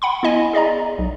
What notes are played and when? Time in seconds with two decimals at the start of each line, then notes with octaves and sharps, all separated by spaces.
0.02 F#5 B5 C6
0.23 B3 E4 D#5 G#5
0.53 G#4 D5 D#5 A#5
0.98 B1